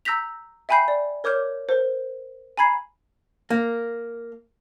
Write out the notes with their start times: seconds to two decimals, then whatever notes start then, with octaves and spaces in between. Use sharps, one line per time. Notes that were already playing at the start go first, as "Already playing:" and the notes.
0.05 A#5 E6 G6 A#6 B6 F7
0.69 E5 G5 G#5 B5 G6 C7
0.88 D5
1.24 A#4 C#5 D6 F6 G6
1.69 A#4 C5
2.57 G#5 A#5 B5 G#6 C7
3.50 A#3